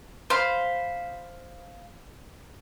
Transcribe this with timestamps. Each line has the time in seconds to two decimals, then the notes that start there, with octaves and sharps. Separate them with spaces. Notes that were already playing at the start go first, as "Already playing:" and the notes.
0.30 C5 F5 B5